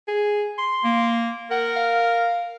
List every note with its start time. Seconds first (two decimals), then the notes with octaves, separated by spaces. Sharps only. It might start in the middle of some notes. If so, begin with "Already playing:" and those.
0.08 G#4
0.58 C6
0.84 A#3
1.51 A#4 F#5
1.76 F5